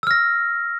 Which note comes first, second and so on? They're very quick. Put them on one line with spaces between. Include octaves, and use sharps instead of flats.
E6 F6 A#6